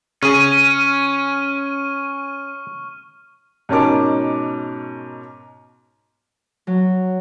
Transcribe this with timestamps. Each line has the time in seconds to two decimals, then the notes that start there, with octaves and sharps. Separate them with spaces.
0.23 C#3 C#4 G#4 C#6 F6 D#7
3.69 G#2 B2 C#4 A#4 A5 D6
6.67 F#3